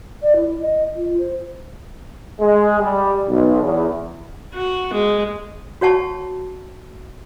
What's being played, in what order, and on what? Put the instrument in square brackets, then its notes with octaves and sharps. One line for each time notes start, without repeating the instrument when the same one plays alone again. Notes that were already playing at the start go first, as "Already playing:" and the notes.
[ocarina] D5
E4
D#5
F4
C5
[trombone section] G#3
G3
B1
E2
[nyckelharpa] F#4
G#3
[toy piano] F#4 C#5 F#5 A5 C#6